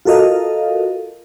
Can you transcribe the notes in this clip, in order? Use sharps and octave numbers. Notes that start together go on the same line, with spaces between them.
F4 F#4 A4 A#4 D#5 F5